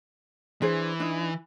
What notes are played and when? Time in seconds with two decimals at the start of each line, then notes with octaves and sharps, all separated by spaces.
0.62 E3 D4 G#4 C5
1.00 D4 D#4